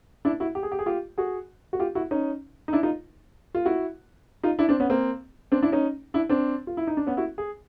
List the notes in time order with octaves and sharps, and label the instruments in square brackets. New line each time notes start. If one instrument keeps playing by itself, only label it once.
[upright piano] D4 E4
E4 F#4
G4
G#4
G4
G#4
F4 G4
F#4 G#4
F#4
F4 G4
E4 F#4
C#4 D#4
D#4
D4 E4
D#4 F4
F4
E4 F#4
D#4 F4
D4 E4
C4 D4
B3 C#4
A#3 C4
C4 D4
D4 E4
C#4 D#4
D4 E4
C4 D4
F4
E4
D#4
D4
B3 C#4
E4 F#4
G#4